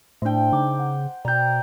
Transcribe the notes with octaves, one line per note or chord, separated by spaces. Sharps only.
A2 A3 D4 C5 G5
C#3 D#4 D6
F#5
B2 D5 G5 A#5 G6